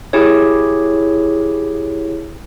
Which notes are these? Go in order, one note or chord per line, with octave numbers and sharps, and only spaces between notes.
E4 G4 G#4 C#5